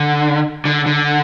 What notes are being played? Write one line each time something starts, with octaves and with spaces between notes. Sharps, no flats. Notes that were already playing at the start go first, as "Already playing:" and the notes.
Already playing: D3
D3
D3